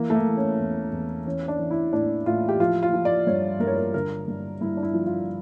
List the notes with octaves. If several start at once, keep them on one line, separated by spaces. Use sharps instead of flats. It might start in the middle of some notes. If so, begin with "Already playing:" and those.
Already playing: E3 A#3
A3
A#3
E3
C#4
E2
E2
E3 C#4
D4
E3
E4
A2 D4
A2 F4
G4
F3 F4
F4
F3
D5
G2 C#5
G2 A#4
C#5
A#4
D3 A#4
G2
G2 E4
D4
E4
F3
F4